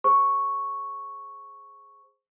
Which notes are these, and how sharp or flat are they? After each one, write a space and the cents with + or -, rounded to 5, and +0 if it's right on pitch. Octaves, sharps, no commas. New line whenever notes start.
G#4 +0 C5 +0 C#6 +0